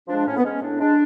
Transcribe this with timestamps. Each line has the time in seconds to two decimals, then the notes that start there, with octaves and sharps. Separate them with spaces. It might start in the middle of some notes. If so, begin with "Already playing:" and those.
0.08 F3 G#3 D4
0.26 A2 C#4
0.37 B3
0.43 G#3 C#4
0.61 A2 D4
0.80 G#3 D4